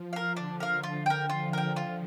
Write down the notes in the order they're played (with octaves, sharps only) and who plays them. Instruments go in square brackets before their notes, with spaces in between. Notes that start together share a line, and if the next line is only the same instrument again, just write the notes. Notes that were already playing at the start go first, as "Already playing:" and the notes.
Already playing: [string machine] F3
[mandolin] A#4 F5
[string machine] D3 [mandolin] D4
[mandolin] A#4 F5
F4
A#4 G5
[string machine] F3 [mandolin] F4
[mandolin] A#4 G5
F4